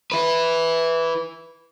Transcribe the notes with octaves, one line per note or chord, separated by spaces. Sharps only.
E4 B4